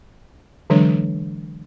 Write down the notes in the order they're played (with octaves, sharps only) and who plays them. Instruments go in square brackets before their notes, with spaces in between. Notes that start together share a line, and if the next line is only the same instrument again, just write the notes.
[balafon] D3 E3 F#3 G#3 D4 C#5